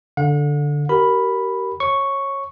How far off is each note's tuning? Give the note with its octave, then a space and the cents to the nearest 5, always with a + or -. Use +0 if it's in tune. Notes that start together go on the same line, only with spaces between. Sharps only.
D3 +0 F#5 -40
G4 -35 A#4 +0 B5 +0
C#5 -20 C#6 +0